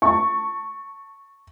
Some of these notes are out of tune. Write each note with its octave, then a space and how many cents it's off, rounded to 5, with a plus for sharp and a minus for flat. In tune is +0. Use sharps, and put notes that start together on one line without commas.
A5 +25 C#6 +0